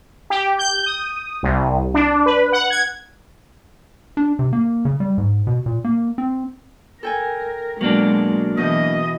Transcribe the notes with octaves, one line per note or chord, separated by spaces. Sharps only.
G4
G6
D#6
C2
D4
B4
F#5
G#6
D4
C3
A#3
C#3
G3
G#2
B2
A#2
A#3
C4
A4 A#4 G5 G#5
B2 F#3 G#3 A#3 D4
B2 E3 D#5 G6